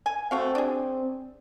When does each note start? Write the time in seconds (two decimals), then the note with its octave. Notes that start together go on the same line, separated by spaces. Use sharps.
0.06 G#5
0.31 A3 C4 F#4 F5
0.55 D4 G#4